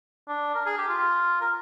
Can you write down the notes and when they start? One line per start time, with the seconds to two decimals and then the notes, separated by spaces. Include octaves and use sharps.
0.28 D4
0.55 A#4
0.66 G#4
0.78 G4
0.88 F4
1.41 A#4